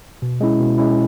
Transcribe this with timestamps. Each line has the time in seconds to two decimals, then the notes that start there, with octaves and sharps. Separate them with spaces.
0.22 B2
0.41 G#3 C#4 E4
0.60 B2
0.78 G#3 C#4 E4